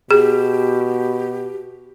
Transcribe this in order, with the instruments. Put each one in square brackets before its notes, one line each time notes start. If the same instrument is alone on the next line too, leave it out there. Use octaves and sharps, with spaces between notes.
[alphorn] B2 [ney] G4 [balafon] G#4